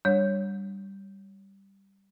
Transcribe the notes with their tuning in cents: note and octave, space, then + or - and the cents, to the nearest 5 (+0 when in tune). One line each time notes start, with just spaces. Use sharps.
G3 +0 D4 +0 C#5 +0